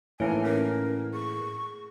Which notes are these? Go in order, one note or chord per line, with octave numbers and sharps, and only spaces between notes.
A2 E3 A#3 D#4 E4 C#5 G#5
C#4 A#4
G#4 C#6